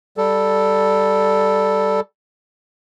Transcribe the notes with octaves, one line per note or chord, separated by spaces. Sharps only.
G3 A4